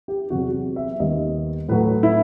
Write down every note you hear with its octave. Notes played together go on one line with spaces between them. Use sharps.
G4
E2 C3 F#3 B3 F#4
E5
D#2 D#3 G3 B3 D#5
A2 F#3 A3 B4
E4